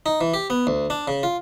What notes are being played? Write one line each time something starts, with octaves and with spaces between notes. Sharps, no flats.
D#4
E3
G4
B3
D2
D4
C#3
F4